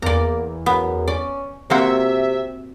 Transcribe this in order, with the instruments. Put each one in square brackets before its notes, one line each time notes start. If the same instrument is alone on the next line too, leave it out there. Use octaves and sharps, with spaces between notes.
[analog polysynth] E2 [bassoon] A#3 [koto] D5 A#5
[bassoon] F#2 [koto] B3
[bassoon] C#4 [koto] D5
[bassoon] C3 [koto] A#3 C4 F#4 [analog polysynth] E5